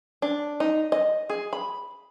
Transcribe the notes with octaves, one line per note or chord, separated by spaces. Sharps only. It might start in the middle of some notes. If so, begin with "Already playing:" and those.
D4
D#4
D#5
G#4
B5